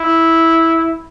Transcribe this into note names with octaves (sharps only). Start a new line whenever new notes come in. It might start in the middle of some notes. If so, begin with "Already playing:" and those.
Already playing: E4